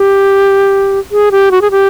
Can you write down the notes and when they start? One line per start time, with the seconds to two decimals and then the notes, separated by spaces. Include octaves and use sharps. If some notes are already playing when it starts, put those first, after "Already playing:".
Already playing: G4
1.11 G#4
1.32 G4
1.51 F#4
1.61 G#4
1.71 G4